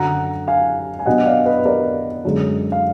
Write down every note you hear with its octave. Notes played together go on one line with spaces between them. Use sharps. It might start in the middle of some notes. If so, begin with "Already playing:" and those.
Already playing: F#2 D3 F#3 F#5 A#5
F5 G#5
G#5
B2 F#3 B3 D4 D#5 F#5
D5 F5
B4 D#5
A#4 D5
F#2 D3 G#3
F5